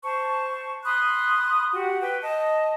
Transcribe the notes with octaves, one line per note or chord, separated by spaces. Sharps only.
C5 A5 C#6
B5 C6 D#6 F#6
F#4 G4 F#5
B4 G5
D#5 A5